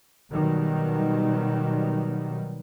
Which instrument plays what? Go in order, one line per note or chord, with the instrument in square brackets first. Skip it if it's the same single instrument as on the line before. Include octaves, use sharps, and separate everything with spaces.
[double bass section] B2 D#3 F#3 G3 B3